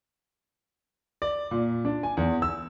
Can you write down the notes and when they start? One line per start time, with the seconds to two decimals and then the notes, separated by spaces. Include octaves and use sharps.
1.22 D5
1.51 A#2
1.85 D4
2.03 G#5
2.17 E2
2.42 E6